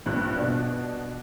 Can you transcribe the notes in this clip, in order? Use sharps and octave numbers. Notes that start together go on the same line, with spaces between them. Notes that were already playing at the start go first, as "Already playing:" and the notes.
A#1 G2 F#6
B2 D4